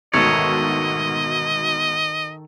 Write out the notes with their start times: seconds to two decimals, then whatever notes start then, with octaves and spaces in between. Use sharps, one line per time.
0.14 D2 G#2 B2 D#3 A4 C#5 D#5